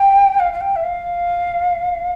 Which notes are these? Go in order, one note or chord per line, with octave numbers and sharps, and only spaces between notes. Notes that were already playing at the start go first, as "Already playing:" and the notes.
Already playing: G5
F5
F5
G5
E5
F5